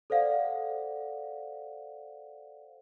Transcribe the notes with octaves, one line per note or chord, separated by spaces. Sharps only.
A4 C5 D5 F5 F#5